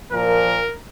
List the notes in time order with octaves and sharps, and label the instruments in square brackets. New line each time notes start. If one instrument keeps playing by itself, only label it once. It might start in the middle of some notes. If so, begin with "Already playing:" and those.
[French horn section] A#2 F3 [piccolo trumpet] A#4